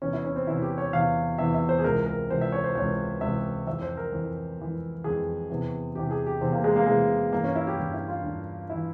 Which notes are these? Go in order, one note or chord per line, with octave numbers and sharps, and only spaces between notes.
E2 C3 E3 C#4
E4
C#4
C4
E2 C3 E3 E4
G4
C#5
E2 C3 E3 F5
E2 C3 E3 E5
E5
C5
G#4
C#2 C3 E3 A#4
A#4
C#2 C3 E3 C5
E5
C#5
C5
C#2 C3 E3 C#5
C#2 C3 E3 E5
F2 E3 E5
C5
A#4
F2 E3
F2 E3
F2 E3 G#4
E2 C3 E3
E2 C3 E3 G4
G#4
G4
E2 C3 E3 C4
A#3
G#3
A#3
E2 C3 E3 G#3
G2 E3 A#3
C#4
E4
G4
G2 E3
E4
F4
G2 E3
E3 E4